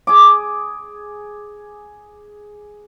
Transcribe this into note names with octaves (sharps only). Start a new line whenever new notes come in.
G#4 D6